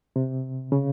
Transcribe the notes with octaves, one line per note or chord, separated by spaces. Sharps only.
C3
C#3